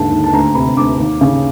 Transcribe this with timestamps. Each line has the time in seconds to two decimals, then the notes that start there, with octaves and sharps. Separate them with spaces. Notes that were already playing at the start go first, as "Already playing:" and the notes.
Already playing: D#2 G#2 D3 A5
0.11 D#2
0.24 A5
0.33 D2 A#5
0.55 C3 B5
0.76 D2 D6
0.99 D#2
1.21 C#3